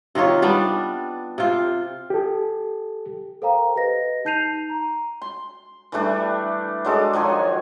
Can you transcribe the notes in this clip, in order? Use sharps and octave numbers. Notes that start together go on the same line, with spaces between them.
C3 D#3 F4 C#5
G3 B3 D4
C3 F4
G4 A4
A4 A#4 C5 F5 G5 A#5
G4 B4 D#5 A#6
D#4 A5 G6 C7 D#7 F7
A#5
C6
E3 G3 A3 D4
F#3 G#3 D4 A4
D#3 F3 F#3 G#5